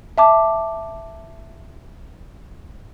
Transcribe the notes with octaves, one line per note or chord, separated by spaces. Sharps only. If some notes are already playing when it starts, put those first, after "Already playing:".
E5 A5 D6